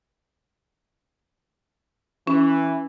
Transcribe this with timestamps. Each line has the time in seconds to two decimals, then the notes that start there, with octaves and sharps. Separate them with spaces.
2.27 E3 C#4